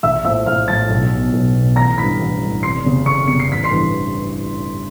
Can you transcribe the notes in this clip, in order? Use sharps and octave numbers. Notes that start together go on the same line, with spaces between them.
A#1 E5 E6
A2 F3 E5 E6
A#1 F5 F6
A2 F3 A5 A6
B1
B2
B1
B2
A1 A#5 A#6
G2 E3 B5 B6
A1
G2 E3
F1 C6 C7
F2 C#3
F1 C#6 C#7
F2 C#3 C#7
C7
A1 B6
C6 C7
G2 E3